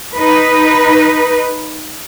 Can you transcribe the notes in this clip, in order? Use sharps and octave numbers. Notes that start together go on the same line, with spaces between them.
D#4 B4